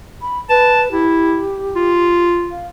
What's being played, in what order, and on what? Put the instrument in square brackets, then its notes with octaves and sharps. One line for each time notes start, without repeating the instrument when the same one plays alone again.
[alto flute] B5
[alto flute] B4 [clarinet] A5
[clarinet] E4 [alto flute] G4
[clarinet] F4
[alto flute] F5